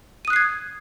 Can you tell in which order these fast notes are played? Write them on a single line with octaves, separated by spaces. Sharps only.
D#7 D#6 F#6 C7 G#6